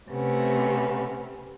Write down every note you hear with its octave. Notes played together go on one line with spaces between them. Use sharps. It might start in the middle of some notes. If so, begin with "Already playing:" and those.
C3 A3 B3 C#4